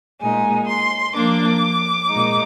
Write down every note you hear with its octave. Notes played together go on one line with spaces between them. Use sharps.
A#2 G#3 D#4 G#5
C6
F3 A#3 D4 D6
A#2 G#3 D#4